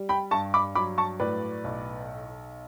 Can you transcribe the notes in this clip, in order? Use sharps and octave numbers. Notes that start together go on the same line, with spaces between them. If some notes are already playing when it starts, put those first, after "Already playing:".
Already playing: G3
G5 B5
G2 A5 C#6
B5 D6
F#3 B5 D6
A5 C#6
A2 B4 D5
B1